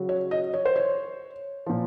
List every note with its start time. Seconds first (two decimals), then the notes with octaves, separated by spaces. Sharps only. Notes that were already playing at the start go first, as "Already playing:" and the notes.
Already playing: C#3 F#3
0.09 C#5
0.31 D#5
0.54 C#5
0.65 C5
0.76 C#5
1.66 A#2 F3